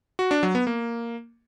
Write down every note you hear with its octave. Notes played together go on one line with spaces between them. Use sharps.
F#4
D4
F#3
B3
A#3